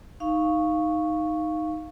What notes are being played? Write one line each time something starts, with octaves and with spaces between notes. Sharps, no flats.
D#4 F5 C#6